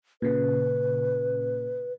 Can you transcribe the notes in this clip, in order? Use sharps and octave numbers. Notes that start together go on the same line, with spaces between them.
A#2 C#3 B4